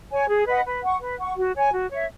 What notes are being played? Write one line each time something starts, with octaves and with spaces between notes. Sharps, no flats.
C#5 G#5
G#4
B4 D#5 F#5
B4
F#5 C#6
B4
F#5 C#6
F#4
C#5 G#5
F#4
C#5 E5